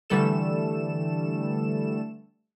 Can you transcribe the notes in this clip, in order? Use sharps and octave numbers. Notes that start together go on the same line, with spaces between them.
D3 E3 G3 A3 A4 E7